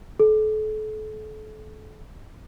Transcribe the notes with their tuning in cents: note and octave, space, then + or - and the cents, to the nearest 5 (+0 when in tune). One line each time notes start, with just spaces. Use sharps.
A4 -35